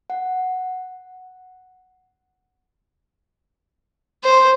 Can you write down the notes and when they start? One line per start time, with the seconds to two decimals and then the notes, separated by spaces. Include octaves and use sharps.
0.10 F#5
4.24 C5